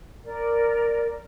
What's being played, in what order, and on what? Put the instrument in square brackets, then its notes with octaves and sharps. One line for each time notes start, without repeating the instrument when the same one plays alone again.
[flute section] A#4 D5